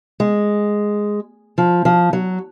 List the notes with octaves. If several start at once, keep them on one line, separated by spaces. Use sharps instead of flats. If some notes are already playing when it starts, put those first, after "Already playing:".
G#3
F3
F3
F#3